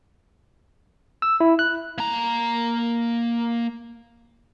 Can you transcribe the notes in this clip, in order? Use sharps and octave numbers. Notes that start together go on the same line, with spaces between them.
E6
E4
F#6
A#3 A#5